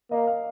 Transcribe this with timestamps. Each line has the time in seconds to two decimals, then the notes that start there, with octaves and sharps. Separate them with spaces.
0.11 A#3 D#5
0.27 F5